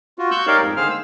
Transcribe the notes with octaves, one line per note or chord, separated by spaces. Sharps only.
F4 F#4
C#6 E6 F#6 G6
D#4 G4 A#4 C#5 D5 F5
F2 G#2 D#4
D3 D#3 G#4 C5 F5 F6
E6